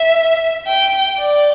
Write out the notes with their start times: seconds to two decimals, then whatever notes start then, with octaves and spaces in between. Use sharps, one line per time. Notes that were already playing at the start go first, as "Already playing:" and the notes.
Already playing: E5
0.67 G5
1.18 D5